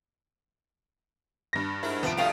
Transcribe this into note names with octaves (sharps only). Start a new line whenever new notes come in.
G2 A#6
G#2 E4 A#4
C2 F3 B3 D7
G2 B2 A3 F4 F5 D#6